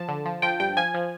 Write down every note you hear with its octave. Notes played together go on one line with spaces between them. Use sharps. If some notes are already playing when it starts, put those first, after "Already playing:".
Already playing: F3 A5
D3
F3
F3 G5
G2 G5
F3 G#5
F3